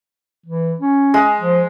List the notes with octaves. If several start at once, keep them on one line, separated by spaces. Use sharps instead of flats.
E3
C#4
G#3
F3